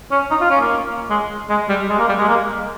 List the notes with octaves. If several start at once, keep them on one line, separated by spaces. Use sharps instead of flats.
C#4
D#4
F4
C#4
A#3
G#3
G#3
G3
G#3
A#3
G3
G#3
A#3